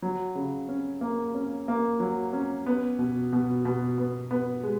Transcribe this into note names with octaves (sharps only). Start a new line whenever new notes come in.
F#3
C#3
C#4
A#3
C#4
A#3
F#3
C#4
B3
B2
B2
B2
B3
B3
G#3